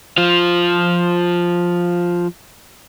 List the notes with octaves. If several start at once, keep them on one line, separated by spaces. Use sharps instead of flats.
F3 F4